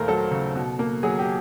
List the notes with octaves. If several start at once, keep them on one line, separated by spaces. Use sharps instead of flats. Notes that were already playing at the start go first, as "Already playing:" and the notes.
Already playing: D#2 A#2 A3 A#4 C5
F#3 A4
C#3
B2
A#3
F#3 G#4
G4